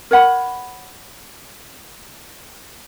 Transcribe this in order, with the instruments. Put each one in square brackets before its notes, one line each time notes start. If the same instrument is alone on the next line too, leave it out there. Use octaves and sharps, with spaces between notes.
[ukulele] A#4 C#5 F#5 B5